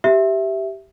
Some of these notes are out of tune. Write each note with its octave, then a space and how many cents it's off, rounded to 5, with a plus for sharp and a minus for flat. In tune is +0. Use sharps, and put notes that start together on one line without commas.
G4 -10 E5 +0